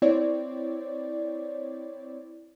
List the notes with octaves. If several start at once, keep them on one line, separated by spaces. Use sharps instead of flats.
C4 E4 C#5 D5